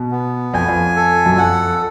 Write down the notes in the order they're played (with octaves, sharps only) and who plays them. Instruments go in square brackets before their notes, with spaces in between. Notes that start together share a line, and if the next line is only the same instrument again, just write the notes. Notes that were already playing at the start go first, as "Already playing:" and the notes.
Already playing: [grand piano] B2
[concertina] B3
[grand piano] F2 [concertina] G#5
[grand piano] F2
[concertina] A4
[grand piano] F#2
[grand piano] F2 [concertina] F#5